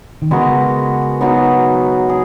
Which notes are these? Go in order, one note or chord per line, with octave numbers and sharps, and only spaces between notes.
D#3
C#3 G#3 B3 F#4 A#4
F#3 B3 D#4 F#4
G#4